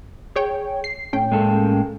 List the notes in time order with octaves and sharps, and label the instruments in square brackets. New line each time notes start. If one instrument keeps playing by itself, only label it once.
[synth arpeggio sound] G#4 C#5 G5
C7
A2 C#4 G5
[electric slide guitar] G#3 A#3 A4